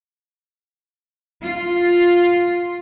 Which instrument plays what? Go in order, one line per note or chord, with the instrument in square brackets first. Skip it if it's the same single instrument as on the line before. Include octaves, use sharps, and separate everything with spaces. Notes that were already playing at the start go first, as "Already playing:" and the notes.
[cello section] F4